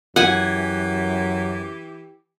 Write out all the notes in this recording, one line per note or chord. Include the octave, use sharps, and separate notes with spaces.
F#2 E3 G4 F#5 G#5